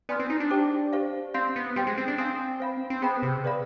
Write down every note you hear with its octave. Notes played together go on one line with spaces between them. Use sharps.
B3 D5 G#5 C6 F6
C4
D#4
D4
G4 C5 G5 D6
G4 C5 F5
C4 F5 C6 G6
B3
G3 C5 G5 C6
G#3
C4
D4
C4 F5 G#5 C6 D#6
C5 F5 B5
C4
B3 G#4 C5 G5 B5
C3
G#4 B4 D5 F5 B5